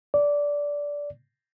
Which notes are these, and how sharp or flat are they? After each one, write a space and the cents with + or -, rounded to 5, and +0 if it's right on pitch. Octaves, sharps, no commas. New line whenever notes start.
D5 -15